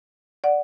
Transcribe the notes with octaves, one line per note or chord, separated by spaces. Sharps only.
D5 F#5